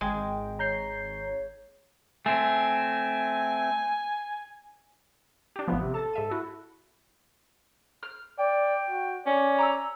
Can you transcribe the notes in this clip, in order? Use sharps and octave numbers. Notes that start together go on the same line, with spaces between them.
G#1 G#3 G5
C#5 A#5 G6 C7
A3 C4 G#5
D4 G4
A1 D3 F3 B3
C3
A4 A5 A6
G#2 E5 D#7
E4 F#4
F6
D5 G5
F#4
C#4 D5
A#5 D6 E6